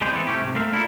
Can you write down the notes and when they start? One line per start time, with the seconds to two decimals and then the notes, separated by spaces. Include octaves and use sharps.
0.01 G3 G#3 C4 G4 G#4 C5
0.12 E3 B3 C4 A4
0.27 C3 A3 C#4 G4
0.41 G#2 C3
0.55 A3 A#3 C4 E5 F5
0.73 D4 E4 F4 G4 A4 A#4